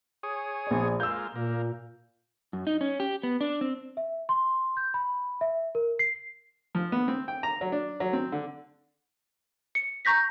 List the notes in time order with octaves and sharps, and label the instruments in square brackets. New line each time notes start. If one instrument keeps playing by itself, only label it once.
[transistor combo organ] G#4 C#5 D#6
[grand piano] A#1 D5
[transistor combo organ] G#3 A#3 F4 [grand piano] E6 G6
[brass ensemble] A#2 [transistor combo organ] A#3
[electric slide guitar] F#2
D#4
C#4
G4
B3
D4
C4
[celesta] E5
C6
G6
B5
E5
A#4
C7
[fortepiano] F3
B3
C4
G5
A#5
F#3
D4
F#3
C4
D3
[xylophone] C#7
A#5 C#6 G6 A#6 B6